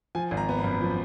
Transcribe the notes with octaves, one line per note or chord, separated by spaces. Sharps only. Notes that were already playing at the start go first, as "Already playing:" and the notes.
F3 G#5
G#1
A#5
B3
B5
F#2
F3